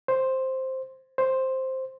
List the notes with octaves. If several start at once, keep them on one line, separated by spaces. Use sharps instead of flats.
C5
C5